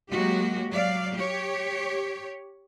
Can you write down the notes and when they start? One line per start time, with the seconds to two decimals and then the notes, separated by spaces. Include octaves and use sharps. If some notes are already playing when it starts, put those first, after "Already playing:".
0.11 F#3 G#3 A#3 F#4 G4
0.70 F#3 D5 F5
1.15 G4 C#5